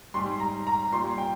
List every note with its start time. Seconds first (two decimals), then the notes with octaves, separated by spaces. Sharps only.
0.14 G#2 G3 C6
0.40 A#5
0.67 A#5
0.93 A#2 G3 C6
1.18 G5